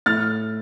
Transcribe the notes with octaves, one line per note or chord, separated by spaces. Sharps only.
A2 F6 A6